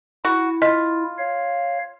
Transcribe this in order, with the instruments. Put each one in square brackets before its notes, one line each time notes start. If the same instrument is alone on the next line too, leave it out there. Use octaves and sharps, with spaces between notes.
[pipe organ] E4 [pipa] F#4
[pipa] F4 [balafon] D#5
[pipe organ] C#5 F5